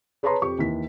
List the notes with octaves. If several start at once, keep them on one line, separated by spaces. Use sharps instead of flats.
G#4 B4 C#5 A5 A#5 C6
F2 G4 C#6
D#2 E3 B6